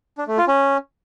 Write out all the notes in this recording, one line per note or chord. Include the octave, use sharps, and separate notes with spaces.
D4
A3
F4
C#4